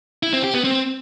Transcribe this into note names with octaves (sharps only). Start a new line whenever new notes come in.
E4
C4
G4
B3
C4